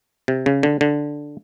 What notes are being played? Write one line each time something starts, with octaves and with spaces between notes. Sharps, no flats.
C3
C#3
D3
D3